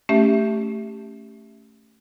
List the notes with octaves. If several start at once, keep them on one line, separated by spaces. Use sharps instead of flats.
A3 C#4 G4 E5